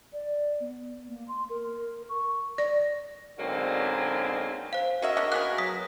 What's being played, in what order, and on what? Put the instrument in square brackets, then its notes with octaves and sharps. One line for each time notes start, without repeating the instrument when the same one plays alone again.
[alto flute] D5
B3
A#3
C6
A#4
C#6
[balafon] D5
[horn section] G#2 B2 D3 F#3 A#3 C4
[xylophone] C5 F5
[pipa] C#4 G#4 E5 [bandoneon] F#4 A#4 D#5
[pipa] B3 C#4 D4
[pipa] A#3 B3 G#4 [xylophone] F#6
[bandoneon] F#3 [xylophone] D#6 B6